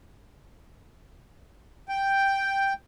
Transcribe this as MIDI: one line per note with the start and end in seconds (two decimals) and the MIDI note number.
1.89 2.73 79